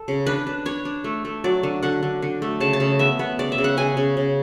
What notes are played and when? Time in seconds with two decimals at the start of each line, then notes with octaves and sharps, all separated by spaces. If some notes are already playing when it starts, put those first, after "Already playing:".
Already playing: A4
0.08 C#3
0.26 D4 B4
0.47 D4
0.65 D4 C#5
0.85 D4
1.04 A3
1.25 A3
1.44 F#3 D5
1.63 D3
1.83 D3 F#5
2.03 D3
2.22 D3
2.42 A3
2.60 C#3 A5
2.73 A5
2.80 C#3
2.99 B3 E5
3.19 B3
3.39 C#3 D5
3.52 E5
3.58 C#3
3.64 F#5
3.77 C#3 G#5
3.97 C#3
4.17 C#3